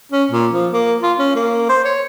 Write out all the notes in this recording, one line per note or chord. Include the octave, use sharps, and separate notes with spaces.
C#4
A#2
F3
A#3
F4
C#4
A#3
C5
C#5